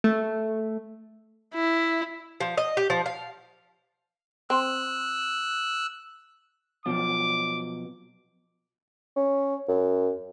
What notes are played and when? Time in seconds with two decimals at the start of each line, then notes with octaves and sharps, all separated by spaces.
0.04 A3
1.54 E4
2.40 F3
2.57 D#5
2.77 G4
2.90 F3
3.06 F5
4.50 C4 E6 F#6
6.86 B2 F3 F#3 D6
9.16 C#4
9.68 F#2